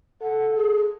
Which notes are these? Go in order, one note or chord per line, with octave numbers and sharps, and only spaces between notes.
A4 F#5
G#4